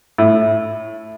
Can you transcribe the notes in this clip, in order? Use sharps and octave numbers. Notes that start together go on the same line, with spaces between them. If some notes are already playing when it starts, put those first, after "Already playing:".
A2